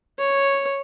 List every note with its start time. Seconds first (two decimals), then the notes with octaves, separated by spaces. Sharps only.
0.19 C#5